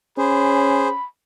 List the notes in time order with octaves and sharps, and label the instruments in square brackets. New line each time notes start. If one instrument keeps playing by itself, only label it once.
[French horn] C#4 [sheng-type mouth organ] G#4 C5 [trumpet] B5